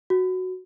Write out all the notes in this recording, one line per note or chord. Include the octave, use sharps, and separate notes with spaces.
F#4